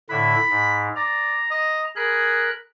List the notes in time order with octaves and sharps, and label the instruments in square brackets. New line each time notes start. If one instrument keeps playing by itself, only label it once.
[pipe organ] A2 D3 E4 [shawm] B5
[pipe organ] G#2
[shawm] D5 [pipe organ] A#5
[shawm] D#5
[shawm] G#4 [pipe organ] A#4 B5 F#6